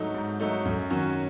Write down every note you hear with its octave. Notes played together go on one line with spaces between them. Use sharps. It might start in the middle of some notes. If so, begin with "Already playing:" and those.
Already playing: G#2 F#3 A3 D#4
G#2
F#3 A3 D#4
F#2
D#3 F#3 C#4 F#4